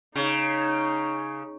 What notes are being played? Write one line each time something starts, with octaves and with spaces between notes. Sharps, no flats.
C#3 D#4